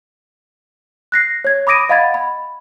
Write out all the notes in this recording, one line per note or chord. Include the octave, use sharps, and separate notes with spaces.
F#6 A#6 C7
C#5 G#6
B5 D6 D#6 A#6 D7 D#7
D#5 F5 F#5 B5 G#6 A6
B5